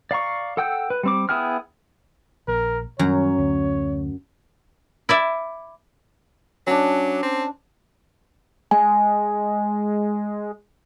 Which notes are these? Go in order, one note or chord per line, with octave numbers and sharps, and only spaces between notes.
D5 F5 A#5 C#6
A4 F#5 G5 E6 G6
B4
G3 C4 D6
B3 E4 G#4 G5 F6
A#1 A#4
F#2 D#3 G3 C#5 A#5
D2
E4 D5 E5
F#3 C#4 D4
C4
G#3 G#5